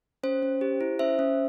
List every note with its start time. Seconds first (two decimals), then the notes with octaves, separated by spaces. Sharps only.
0.23 C#4 C5
0.43 C#4
0.61 G4
0.81 E4
0.99 C#4 C5 E5
1.19 C#4